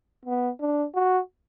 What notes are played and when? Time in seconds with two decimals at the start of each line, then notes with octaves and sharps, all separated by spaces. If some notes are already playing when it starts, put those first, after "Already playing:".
0.26 B3
0.61 D4
0.95 F#4